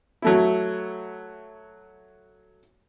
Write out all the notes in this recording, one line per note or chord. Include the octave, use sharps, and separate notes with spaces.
F#3 A3 E4